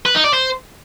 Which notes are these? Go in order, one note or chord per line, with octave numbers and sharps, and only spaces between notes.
B4
D#4
D5
C5